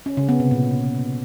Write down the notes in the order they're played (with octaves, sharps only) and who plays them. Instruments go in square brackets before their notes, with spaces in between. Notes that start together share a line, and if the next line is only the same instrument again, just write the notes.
[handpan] C#4
C#3
B3
C3
A#2